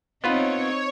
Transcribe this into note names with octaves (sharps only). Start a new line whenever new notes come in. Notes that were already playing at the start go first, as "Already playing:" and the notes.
B3 C4 D#4 F4 B4 C#5